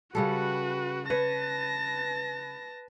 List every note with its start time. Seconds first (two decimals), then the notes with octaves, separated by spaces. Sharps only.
0.15 C#3 G3 F#4 A4 B4
1.10 B4 C#5 A5 A#6